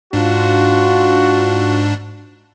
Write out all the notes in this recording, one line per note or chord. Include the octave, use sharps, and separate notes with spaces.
G#2 D4 F4 F#4